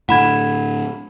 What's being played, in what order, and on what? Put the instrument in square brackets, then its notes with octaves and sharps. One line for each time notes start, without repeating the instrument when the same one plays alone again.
[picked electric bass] A2 D3 [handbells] F#5 B5 G#6